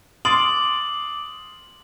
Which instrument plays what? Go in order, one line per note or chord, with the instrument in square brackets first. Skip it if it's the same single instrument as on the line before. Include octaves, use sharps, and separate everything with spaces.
[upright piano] C6 [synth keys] D6 [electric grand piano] D#6 F6 A6 [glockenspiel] F#7